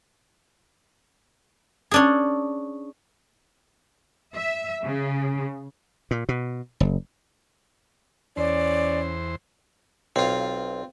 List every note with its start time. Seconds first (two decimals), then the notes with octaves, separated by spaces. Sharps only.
1.91 C#4 D4 G#4
4.35 E5
4.84 C#3
6.11 A#2
6.29 B2
6.80 F#1
8.37 E2 C#4 C5 D5
10.16 B1 C4 F4 F5